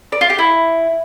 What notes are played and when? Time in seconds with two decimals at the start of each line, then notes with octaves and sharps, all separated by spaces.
0.12 D5
0.21 F4
0.30 G4
0.39 E4